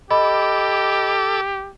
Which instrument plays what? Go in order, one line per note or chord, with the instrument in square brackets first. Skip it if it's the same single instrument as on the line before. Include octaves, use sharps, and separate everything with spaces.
[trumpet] G4 [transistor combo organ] A4 D6 E6 [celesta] D#5 B5